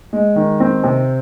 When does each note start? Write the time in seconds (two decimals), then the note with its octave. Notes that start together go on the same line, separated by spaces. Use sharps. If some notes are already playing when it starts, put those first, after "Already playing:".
0.13 G#3
0.36 D#3
0.60 C4
0.84 C3